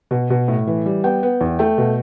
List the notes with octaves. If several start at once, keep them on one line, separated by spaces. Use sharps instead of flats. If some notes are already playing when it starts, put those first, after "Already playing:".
B2
B2
A2
E3
G3
B3 G5
B3
E2
A3 G5
B2